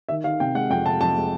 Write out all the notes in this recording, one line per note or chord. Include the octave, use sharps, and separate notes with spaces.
D#3 E5
D#3 F5
C3 G5
G#3 F#5
F2 G5
C3 A5
F2 A5
G#3